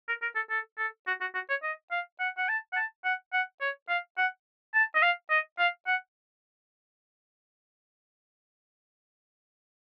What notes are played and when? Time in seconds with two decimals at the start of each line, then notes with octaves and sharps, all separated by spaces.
0.08 A#4
0.22 A#4
0.36 A4
0.50 A4
0.78 A4
1.07 F#4
1.21 F#4
1.35 F#4
1.49 C#5
1.63 D#5
1.91 F5
2.20 F#5
2.38 F#5
2.49 A5
2.73 F#5
2.76 A5
3.05 F#5
3.33 F#5
3.61 C#5
3.89 F5
4.18 F#5
4.74 A5
4.95 D#5
5.02 F5
5.30 D#5
5.59 F5
5.87 F#5